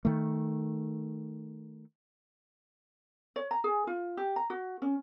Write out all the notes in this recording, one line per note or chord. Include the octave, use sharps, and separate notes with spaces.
D#3 A3
C#5
A#5
G#4
F4
G4
A#5
F#4
C#4